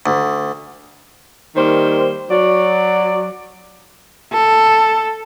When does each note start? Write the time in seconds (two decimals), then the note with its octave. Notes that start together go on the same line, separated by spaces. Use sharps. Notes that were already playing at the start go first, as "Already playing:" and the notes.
0.06 D2
1.55 D#3 G3 A#3 C5
2.30 F#3 D5
4.33 A4